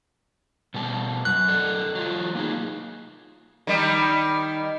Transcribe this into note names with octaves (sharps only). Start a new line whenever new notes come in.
B2 G3 A5
F#2 F#6
A4 D5 D#5
F#3 F4
A#3 D#4 G#4
D#3 G3 D#4